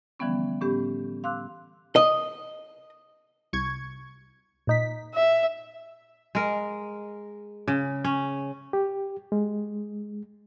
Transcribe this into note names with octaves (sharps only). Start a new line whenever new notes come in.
D3 E3 F3 G3 B3 C#4
A2 B3 C#4 G4 G6
F5 C6 D6 E6 F#6
D#5
C2 C#6 G#6
A#2 D#4 B6
E5
G#3 A#4
C#3
C#4
G4
G#3